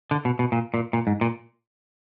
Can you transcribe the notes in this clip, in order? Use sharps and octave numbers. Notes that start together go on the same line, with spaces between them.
D3
B2
B2
A#2
A#2
A#2
G#2
A#2